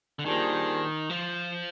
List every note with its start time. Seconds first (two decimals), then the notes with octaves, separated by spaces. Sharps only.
0.19 D3
0.25 A#2 D#3 G3 D4 G#4 C5
1.10 F3